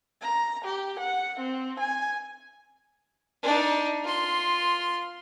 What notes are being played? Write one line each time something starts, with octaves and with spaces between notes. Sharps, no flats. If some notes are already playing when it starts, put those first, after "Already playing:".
A#5
G4
F#5
C4
G#5
D4 D#4
F4 C6